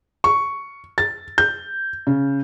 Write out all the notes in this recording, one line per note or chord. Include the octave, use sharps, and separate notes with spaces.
C#6
A6
G6
C#3